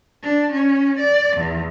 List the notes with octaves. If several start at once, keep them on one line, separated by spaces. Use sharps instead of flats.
D4
C#4
D5
E2